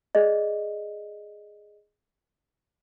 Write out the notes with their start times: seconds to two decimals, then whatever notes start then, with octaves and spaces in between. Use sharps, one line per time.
0.15 G#4 D5 D#5